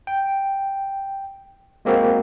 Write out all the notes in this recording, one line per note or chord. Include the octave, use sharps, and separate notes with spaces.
G5
G#3 A#3 C4 F#4 A#4